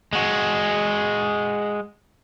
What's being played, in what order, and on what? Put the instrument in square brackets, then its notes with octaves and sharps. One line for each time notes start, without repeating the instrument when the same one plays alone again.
[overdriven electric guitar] G#3 F#4